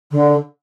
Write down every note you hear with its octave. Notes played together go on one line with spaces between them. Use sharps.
D3